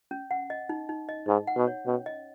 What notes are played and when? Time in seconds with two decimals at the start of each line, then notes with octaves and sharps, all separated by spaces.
0.11 C#4
0.31 F#5
0.50 D#5
0.69 D#4
0.89 D#4
1.09 D#5
1.28 G#2 D#4
1.47 F#5
1.57 B2
1.67 C#5
1.87 B2 C#4
2.06 D#5